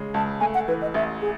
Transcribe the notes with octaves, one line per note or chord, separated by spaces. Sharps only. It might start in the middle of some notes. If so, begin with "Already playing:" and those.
Already playing: C#3 G#3
C#2 A5
A3 G#5
F#5
E3 B4
D#5
A1 E5
G#4